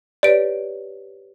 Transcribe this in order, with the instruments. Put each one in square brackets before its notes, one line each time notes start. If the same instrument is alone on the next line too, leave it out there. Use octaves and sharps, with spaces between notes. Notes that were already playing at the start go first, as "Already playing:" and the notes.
[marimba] G4 B4 C#5 [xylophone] D5 D7